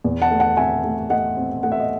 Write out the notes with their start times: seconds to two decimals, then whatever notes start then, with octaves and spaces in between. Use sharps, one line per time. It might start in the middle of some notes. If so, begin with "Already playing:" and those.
0.04 E2
0.22 F#5 A5
0.31 A3
0.40 F#5 A5
0.57 C4 E5 G#5
0.84 A3
1.10 A3 D#5 F#5
1.37 C4
1.63 A3 F#5
1.72 E5
1.80 D#5